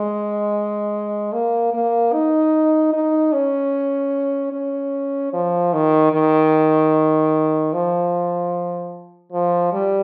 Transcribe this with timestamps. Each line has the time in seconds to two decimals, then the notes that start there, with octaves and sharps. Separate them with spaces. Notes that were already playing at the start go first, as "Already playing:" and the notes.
Already playing: G#3
1.33 A#3
1.74 A#3
2.13 D#4
2.93 D#4
3.33 C#4
4.53 C#4
5.33 F3
5.73 D#3
6.13 D#3
7.73 F3
9.32 F3
9.72 G3